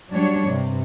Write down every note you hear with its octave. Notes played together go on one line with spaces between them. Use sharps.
F#3 G3 D4 C#5
G2 C3